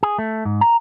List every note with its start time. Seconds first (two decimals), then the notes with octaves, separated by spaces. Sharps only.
0.03 G#4
0.18 A3
0.45 G#2
0.61 A#5